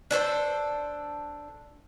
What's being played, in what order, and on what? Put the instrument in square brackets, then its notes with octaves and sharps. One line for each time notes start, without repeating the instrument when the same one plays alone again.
[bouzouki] D4 A4 B4 C5